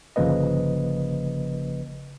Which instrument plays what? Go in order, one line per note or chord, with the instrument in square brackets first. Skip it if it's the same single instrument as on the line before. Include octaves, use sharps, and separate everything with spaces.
[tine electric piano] G1 C#3 F3 A#3 B4 D#5